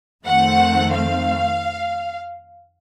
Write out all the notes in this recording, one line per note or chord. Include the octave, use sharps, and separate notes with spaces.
F2 D#3 A3 C4 F#5
F5